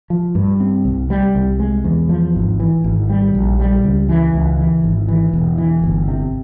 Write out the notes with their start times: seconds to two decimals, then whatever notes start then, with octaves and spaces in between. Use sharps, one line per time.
0.10 F3
0.35 G2
0.60 C4
0.85 C2
1.10 G3
1.35 C2
1.60 G#3
1.84 E2
2.09 F3
2.35 G#1
2.60 E3
2.84 G#1
3.10 G3
3.35 A#1
3.60 G3
3.84 C#2
4.09 E3
4.34 C#2
4.59 E3
4.84 G#1
5.08 E3
5.33 E1
5.58 E3
5.83 G1
6.08 C3